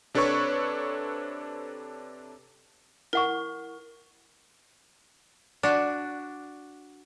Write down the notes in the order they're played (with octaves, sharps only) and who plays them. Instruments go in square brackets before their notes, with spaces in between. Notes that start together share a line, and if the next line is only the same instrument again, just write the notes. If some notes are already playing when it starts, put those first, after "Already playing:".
[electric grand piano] C3 D4 A4 B4 C#5 C#6
[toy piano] E4 F#5 C#6 [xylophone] A#4
[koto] D4 F#4